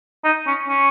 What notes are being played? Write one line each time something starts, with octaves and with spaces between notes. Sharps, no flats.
D#4
C#4
C#4